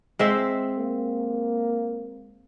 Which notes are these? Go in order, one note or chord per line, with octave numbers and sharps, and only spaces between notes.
G#3 C4 E5
A#3